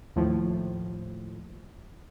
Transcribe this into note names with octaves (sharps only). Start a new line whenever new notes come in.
D#2 A2 F3